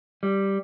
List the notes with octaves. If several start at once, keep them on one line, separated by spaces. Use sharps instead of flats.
G3